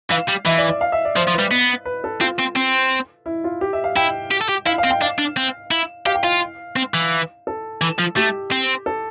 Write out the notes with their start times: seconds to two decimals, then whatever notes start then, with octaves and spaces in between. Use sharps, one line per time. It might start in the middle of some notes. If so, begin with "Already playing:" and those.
0.11 E3 F5
0.29 G3
0.46 E3 E5
0.58 D5
0.69 D5
0.81 F5
0.92 E5
1.05 D5
1.16 F3 C5
1.28 F3
1.34 G3 B4
1.51 B3
1.85 B4
2.04 A4
2.21 C4 F4
2.39 C4
2.56 C4
3.26 E4
3.44 F4
3.61 G4
3.73 E5
3.84 F5
3.96 E4 G5
4.31 G4
4.41 A4
4.49 G4
4.66 E4 F5
4.78 F5
4.84 C4
4.90 G5
5.01 D4 F5
5.19 D4
5.37 C4
5.71 E4
6.06 G4 F5
6.15 G5
6.23 F4 F5
6.76 C4
6.94 E3
7.47 A4
7.82 E3
7.99 F3
8.16 A3 G4
8.51 C4
8.86 A4